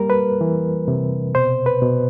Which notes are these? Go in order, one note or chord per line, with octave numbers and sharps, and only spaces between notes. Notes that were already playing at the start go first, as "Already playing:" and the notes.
Already playing: G3 A#3 A#4
B4
E3
C3
B2 C5
B4
B2